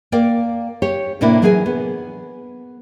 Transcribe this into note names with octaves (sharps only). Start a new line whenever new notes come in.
A#3 A#4 D5 G5
G4 C#5
A2 C3 A#3 D4 E4
E3 F#3 G#4 A#4 C5 G#5
B3